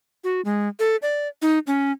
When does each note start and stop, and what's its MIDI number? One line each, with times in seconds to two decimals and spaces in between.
0.24 0.41 66
0.45 0.68 56
0.79 0.96 69
1.02 1.28 74
1.42 1.59 63
1.67 1.92 61